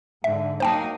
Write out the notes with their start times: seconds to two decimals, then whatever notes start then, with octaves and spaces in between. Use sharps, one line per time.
0.24 G#2 D3 E5
0.60 F#3 A#3 D#4 C5 G5 A5